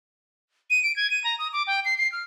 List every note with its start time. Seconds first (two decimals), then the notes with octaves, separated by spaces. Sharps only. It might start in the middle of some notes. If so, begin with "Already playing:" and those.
0.70 D#7
0.83 D7
0.96 G#6
1.10 D#7
1.24 A#5
1.39 D#6
1.53 D6
1.67 G5
1.85 C7
1.98 C7
2.12 F6